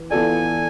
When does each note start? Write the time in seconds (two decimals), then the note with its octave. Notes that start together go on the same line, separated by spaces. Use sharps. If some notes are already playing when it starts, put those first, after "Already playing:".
Already playing: E3
0.11 E3 B3 F4 A4 D5 G#5